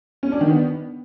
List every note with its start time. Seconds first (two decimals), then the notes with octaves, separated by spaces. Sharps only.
0.23 C#4
0.32 D4
0.41 D#3
0.50 B3